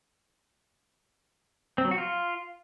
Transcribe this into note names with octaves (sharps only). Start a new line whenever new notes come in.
C4
F#3
F#4
F4